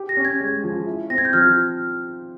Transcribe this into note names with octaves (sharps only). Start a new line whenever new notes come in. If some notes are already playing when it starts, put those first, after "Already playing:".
Already playing: G4
A#6
C#4
G#6
G#3
F3
E4
C4 A#6
G#6
G6
F3 F6